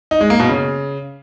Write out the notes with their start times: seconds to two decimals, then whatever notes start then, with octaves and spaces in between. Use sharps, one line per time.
0.11 D#4
0.21 G#3
0.30 A#3
0.40 B2
0.49 C#3